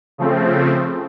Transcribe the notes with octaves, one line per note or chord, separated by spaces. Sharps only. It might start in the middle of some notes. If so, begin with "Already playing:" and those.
C#3 F3 A3 C4